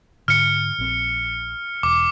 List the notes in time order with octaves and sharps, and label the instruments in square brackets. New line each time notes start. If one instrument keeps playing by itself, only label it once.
[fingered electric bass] G#2 D3 [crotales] F6 C#7
[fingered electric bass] A#1 C4
[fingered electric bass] E1 [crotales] D6